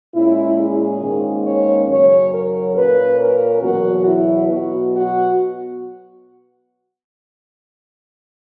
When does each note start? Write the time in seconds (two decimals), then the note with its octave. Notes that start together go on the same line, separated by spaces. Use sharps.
0.15 A#2 G#3 C#4 E4
0.58 G#4
1.02 G#2 D#3 A#3 C#4
1.45 C#5
1.89 F#2 C#3 F#3 C#5
2.32 A#4
2.75 A#2 A#3 C#4 B4
3.19 A#4
3.62 E2 B2 F#3 B3 F#4
4.06 E4
4.49 B2 F#3 B3 F#4
4.93 F#4